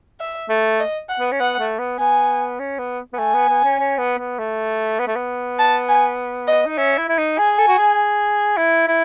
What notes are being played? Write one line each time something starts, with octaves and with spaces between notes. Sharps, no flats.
E5
A3
D#5
F#5
B3
C#4
B3 F#5
A3
B3
B3 G#5
C#4
B3
B3
A3 G#5
B3
B3
C#4
C#4
B3
B3
A3
B3
A3
B3
A5
G#5
D#5
D#4
C#4 E5
E4
E4
D#4
G#4 G#5
A4
F#4
G#4
E4
E4